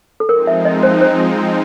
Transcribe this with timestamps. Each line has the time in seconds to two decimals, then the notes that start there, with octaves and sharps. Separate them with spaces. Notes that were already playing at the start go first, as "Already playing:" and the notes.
0.20 A4
0.29 F3 G#3 C4 D#4 A#4
0.47 E5
0.65 D#5
0.83 C5
1.01 C5